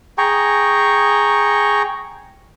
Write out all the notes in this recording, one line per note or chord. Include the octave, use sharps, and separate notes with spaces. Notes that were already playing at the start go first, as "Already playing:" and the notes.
G#4 G5 A#5 C#6